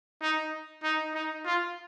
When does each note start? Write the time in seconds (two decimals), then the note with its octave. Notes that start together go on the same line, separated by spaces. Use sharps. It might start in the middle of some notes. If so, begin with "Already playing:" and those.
0.22 D#4
0.84 D#4
1.14 D#4
1.45 F4